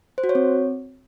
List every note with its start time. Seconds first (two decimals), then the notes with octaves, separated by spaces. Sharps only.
0.18 C5
0.24 F#4
0.29 C#5
0.35 C4